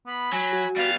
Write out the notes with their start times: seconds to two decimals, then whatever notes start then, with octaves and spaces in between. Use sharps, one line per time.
0.06 B3 B5
0.33 F#3 G#5
0.53 F#4
0.77 G3 B3 F5